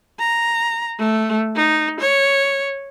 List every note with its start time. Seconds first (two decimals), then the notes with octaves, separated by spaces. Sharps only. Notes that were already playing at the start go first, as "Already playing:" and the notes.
0.19 A#5
0.98 A3
1.56 D#4
2.00 C#5